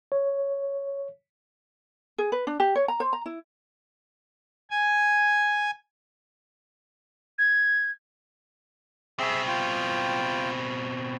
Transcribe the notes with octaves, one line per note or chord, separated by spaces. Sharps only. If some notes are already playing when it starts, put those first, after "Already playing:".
C#5
G#4
B4
D4
G4
C#5
A#5
C5
A#5
E4
G#5
G#6
B2 C4 G#4 E5 E6
F4 G5